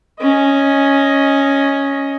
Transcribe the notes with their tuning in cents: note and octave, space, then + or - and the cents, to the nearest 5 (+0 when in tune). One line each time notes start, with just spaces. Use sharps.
C#4 +0 D#5 +10